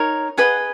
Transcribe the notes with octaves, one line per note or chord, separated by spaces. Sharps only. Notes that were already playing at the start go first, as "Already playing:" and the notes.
Already playing: D#4 A#4 C#5
G#4 B4 D#5 F#5